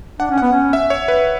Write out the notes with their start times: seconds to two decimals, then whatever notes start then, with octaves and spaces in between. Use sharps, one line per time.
0.20 D4 F#5
0.30 C#4
0.38 F#5
0.42 B3
0.52 C#4
0.73 E5
0.90 C#5
1.08 B4